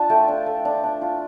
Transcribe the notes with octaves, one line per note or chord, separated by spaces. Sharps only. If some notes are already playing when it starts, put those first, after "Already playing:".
Already playing: D4 F4 A5
A3 G5
D4
A3
D4
D4
F4